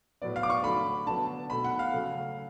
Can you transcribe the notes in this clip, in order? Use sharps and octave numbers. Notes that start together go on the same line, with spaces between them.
A2 F#3 B3 D5
F5
D6
C#6
D3 F#3 A3 B5
D3 F#3 B3 A5
B2 A3 B5
F#5
F5
C#3 F#3 A3